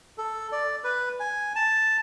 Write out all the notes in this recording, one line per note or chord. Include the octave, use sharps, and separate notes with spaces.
A4
D5
B4
G#5
A5